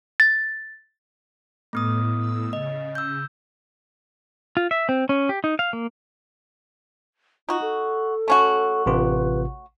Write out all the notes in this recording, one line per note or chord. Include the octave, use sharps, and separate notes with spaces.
A6
A2 A3 B3 D#6
A2 E6
C#3 D#5
E6 G6
F4
E5
C4
C#4
G4
D#4
F5
A#3
D#4 F4 F#4
A4
A3 C#4 F#4
A1 C3 F4 B4